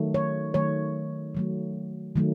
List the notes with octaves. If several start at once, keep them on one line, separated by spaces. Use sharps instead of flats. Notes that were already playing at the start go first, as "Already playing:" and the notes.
Already playing: D#3 F#3 A3
C#5
D#3 F#3 A3 C#5
D#3 F#3 A3
D#3 F#3 A3